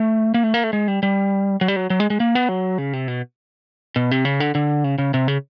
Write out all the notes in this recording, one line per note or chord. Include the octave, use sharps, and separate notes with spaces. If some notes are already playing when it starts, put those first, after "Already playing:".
Already playing: A3
A#3
A3
A#3
A3
G#3
G3
G3
F#3
G3
F#3
F#3
G#3
G#3
A#3
B3
F#3
C#3
C3
B2
B2
C3
C#3
D3
D3
C#3
C#3
C3
C#3